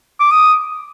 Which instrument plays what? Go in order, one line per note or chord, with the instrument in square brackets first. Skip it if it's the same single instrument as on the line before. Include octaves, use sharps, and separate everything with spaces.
[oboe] D6
D#6